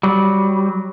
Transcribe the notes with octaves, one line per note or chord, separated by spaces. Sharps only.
F#3 G3